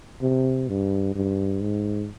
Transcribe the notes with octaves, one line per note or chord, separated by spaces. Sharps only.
C3
G2
G2
G#2